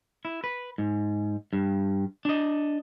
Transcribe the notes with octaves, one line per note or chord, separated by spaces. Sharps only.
E4
B4
G#2
G2
D4 D#5